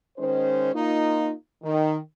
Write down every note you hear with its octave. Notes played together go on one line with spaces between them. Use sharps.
D#3 G#3 C#4 C5
A#3 D#4 F4
D#3